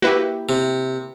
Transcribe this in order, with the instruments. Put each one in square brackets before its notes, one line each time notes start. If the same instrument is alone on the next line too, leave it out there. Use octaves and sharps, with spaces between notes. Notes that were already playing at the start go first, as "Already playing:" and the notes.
[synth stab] A#3 E4 G4 [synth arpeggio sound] F#4 B4
[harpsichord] C3